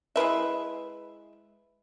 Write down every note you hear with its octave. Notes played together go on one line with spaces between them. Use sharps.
G#3 E4 B4 E5